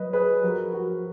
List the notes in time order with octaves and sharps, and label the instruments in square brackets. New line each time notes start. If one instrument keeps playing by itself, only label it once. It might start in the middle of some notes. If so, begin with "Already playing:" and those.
Already playing: [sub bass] F#3 [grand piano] B4 D#5
[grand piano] G#4 B4
[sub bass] F3 [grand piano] F#4 A#4
[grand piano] F#4